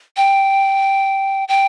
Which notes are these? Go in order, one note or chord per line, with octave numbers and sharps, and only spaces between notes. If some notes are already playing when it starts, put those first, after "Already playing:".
G5
G5